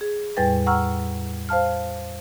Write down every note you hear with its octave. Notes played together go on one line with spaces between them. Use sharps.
G#4
E2 A2 G3 B4 G5 A6
F#5 A#5 C#6 E6 F6
C5 F5 A5 F6